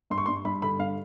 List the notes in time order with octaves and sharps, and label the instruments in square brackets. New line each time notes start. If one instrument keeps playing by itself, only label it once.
[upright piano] G2 C6
C#6
G2 C6
G2 B5
D3 B5
G2 F5